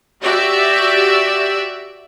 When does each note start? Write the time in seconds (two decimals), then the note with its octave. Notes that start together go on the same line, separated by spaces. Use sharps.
0.23 F#4 G4 D5 E5